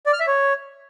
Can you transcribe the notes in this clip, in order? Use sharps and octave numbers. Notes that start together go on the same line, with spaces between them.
D5
F6
E5
C#5